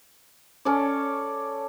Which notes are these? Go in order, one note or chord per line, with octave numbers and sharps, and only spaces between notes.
C#4 A4 C#5 D5